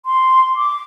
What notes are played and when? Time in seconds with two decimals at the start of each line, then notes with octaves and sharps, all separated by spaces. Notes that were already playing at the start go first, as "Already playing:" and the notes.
0.06 C6
0.56 D6